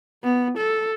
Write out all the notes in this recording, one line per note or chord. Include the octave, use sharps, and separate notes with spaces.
B3
A4